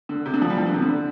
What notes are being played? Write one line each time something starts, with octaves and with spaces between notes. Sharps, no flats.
D3
C3
D3
F3
G3
F3
D3
C3
D3